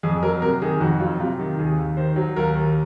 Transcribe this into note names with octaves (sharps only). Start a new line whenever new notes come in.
F2 G#4
F#3 A#4
C3 A#4
D#3 G#4
F2 F#4
F#3 F4
C3 F4
D#3
D#2 G#4
D#2
D#3 C5
F#3
D#2 A#4
D#2